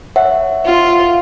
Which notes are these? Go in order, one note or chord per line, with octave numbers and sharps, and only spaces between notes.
C#5 E5 F#5
F4